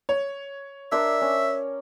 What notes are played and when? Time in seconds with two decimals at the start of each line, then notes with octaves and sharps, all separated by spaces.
0.09 C#5
0.92 D4 A#4 C5 E5
1.21 C#4